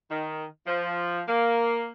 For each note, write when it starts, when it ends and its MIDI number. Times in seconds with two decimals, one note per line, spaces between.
0.10 0.45 51
0.66 1.21 53
1.28 1.91 58